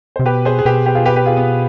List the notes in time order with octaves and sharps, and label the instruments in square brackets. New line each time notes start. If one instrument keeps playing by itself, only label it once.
[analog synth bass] C3 [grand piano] C5
[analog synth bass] B2 [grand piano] G4 B4
[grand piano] G#4 C5
G#4
[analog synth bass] B2 [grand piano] G4 B4
[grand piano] G4 B4
F4 G#4
G4 B4
G4 B4
F4 G#4
B3